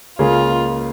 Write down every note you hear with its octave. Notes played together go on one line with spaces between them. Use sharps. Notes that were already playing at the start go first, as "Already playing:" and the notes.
C#2 C#3 A#3 C#4 F4 G#4